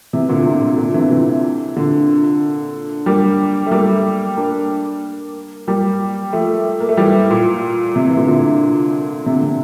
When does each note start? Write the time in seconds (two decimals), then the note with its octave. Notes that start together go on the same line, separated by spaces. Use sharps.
0.13 C3 E3
0.29 A#2 D3
0.45 C3
0.62 A#2
0.78 A#2 D3
0.94 C3 E3
1.11 C3 E3
1.77 A#2 D3
3.06 G3 A#3
3.67 A3
3.71 G3 A#3
4.37 A#3 D4
5.67 G3 A#3
6.33 F3 A3
6.80 A#3
6.89 A3
6.97 E3 G3
7.31 A#2
7.96 C3
8.06 C3 E3
8.17 A#2 D3
8.28 A#2 D3
9.26 C3
9.34 D3
9.42 C3